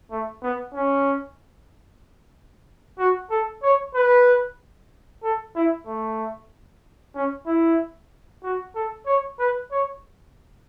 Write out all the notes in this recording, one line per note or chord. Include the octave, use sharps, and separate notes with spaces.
A3
B3
C#4
F#4
A4
C#5
B4
A4
E4
A3
C#4
E4
F#4
A4
C#5
B4
C#5